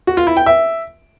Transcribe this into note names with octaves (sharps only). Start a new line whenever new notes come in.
F#4
F4
E4
G5
E5